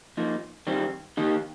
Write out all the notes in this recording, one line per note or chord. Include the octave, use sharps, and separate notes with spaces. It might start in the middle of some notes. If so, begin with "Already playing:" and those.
F3 A#3 D#4
D#3 G3 C4
D#3 A#3 D#4 G4